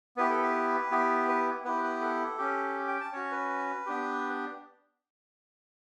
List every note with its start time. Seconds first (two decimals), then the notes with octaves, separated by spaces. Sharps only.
0.17 B3 E4 G4 B4
0.30 A4
0.42 B4
0.91 B3 E4 G4
1.29 B4
1.64 B3 E4 G4 B4
1.84 B4
2.01 A4
2.38 C#4 G4
2.88 G5
3.01 A5
3.13 C#4 F#4 C#5
3.32 B4
3.86 B3 D4 G4